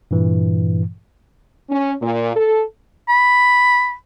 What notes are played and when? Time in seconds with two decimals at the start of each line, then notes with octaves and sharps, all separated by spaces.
0.11 G2 A#2 E3
1.70 C#4
2.01 A#2
2.36 A4
3.09 B5